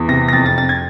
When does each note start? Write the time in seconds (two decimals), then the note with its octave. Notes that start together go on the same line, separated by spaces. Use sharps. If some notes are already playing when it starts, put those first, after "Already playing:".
Already playing: E2
0.08 C3 A#6
0.28 A#6
0.33 F2 A6
0.46 A6
0.57 F2 A6
0.69 G#6